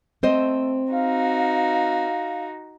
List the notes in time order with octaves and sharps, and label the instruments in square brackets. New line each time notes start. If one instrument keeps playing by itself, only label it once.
[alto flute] A3 [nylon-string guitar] C4 C5 D#5
[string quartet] D#4 F#4 [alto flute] F5